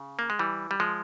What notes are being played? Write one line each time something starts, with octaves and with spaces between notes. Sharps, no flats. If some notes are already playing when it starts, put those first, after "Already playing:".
Already playing: C#3
A#3
G#3
E3 G3
G3
F3 G#3